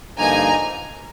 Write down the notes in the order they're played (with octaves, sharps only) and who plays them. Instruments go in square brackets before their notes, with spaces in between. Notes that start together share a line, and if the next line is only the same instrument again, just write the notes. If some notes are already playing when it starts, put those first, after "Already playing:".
[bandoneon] G2 D3 F3 A#3 D#4 [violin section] G#5 A#5